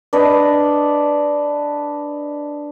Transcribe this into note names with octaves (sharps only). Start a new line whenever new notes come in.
D4 B4 D#5